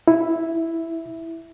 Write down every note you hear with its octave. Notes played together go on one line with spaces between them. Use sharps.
E4